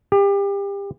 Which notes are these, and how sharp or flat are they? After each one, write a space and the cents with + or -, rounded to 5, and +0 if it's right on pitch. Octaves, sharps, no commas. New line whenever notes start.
G4 +30